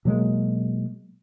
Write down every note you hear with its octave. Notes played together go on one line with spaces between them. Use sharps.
B2 F#3 G#3 A#3